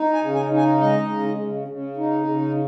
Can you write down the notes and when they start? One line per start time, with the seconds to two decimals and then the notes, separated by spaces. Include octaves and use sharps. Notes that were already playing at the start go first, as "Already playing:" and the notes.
Already playing: D#4
0.13 G#5
0.21 C#3
0.35 G#5
0.51 D#4
0.57 G#5
0.79 G#3 D#5
1.09 C#3
1.38 C#3
1.68 C#3
1.97 D#4
2.27 C#3